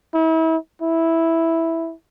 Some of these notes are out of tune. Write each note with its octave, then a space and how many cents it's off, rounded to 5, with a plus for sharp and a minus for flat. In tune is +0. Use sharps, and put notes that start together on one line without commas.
E4 -35
E4 -5